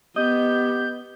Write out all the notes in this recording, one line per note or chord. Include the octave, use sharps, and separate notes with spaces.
B3 G4 D#5 G6